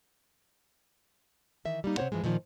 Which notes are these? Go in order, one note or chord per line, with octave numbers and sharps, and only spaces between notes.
D#3 E3 E5
G3 A#3 D#4
C3 C4 F#4 C5 C#5 F#5
G#2 E3 F3 G#3
A#2 D#3 F3 A#3